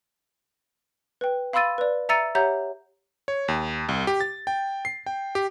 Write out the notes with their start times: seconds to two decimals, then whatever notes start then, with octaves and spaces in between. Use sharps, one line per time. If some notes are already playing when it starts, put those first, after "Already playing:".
1.21 B4 G5
1.53 F5 B5 C6 E6 A6 D#7
1.78 B4 D5
2.09 E5 A#5 E6 A6 C#7 D#7
2.35 G4 C#5 E5 F#5 A#5 G6
3.28 C#5
3.48 D#2
3.89 C2
4.07 G4
4.21 A6
4.47 G5
4.85 C7
5.06 G5
5.35 G4